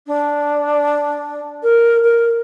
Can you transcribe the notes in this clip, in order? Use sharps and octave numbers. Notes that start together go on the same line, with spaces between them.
D4
A#4
A#4